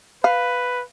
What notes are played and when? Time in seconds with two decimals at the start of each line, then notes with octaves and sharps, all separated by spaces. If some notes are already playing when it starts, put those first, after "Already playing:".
0.24 B4 F5